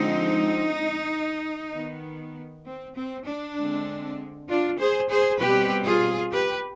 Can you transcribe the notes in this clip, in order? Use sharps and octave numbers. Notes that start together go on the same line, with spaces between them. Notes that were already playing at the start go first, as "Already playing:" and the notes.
Already playing: D3 F3 G#3 C4 D#4
D#3 B3
C4
C4
D4
D3 G#3 C4
D4 F4
G#4 C5
G#4 C5
B2 G3 C4 G4 B4
F4 G#4
G4 B4